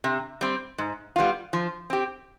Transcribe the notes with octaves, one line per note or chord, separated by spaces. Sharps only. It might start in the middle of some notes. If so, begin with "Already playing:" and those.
C3
G3 C4
G#2
G3 B3 F4
F3
C4 G4